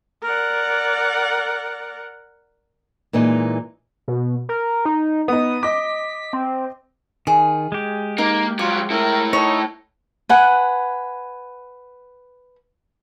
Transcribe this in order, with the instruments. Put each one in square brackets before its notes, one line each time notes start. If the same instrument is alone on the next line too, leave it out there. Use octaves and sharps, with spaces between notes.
[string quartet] A#4 D5 F#5
[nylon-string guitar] A#2 E3 G#3 D#4
[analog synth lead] B2
A#4
D#4
[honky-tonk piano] B3 D#4 [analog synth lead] D#6
[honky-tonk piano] D#5 D6 [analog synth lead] B6
[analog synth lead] C4
[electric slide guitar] D#3 [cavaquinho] G#4
[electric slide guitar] G#3 G4
[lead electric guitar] A#3 [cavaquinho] D#4
[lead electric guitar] F#3 G3 [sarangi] F4 [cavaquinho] D6
[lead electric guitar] A3 E4 [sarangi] A#4
[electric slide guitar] D#4 [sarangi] A4 [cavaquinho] C#5
[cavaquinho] B4 F#5 G#5